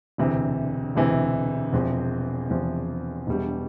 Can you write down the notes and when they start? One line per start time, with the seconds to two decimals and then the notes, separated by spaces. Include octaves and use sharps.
0.18 E1 D2 C3 E3
0.96 E1 D2 C3 E3
1.73 E1 E2 C3 F3
2.50 E1 E2 C3 F3
3.27 E1 E2 B2 G3 D4